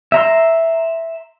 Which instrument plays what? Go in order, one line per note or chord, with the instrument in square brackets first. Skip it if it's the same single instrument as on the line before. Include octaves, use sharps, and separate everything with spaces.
[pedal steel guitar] E5 A#5 C6